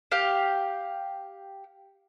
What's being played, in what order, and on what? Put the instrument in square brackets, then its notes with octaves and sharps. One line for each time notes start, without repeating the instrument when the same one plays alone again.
[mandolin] G4 F5